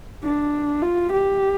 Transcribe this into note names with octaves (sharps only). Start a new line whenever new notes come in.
D4
F4
G4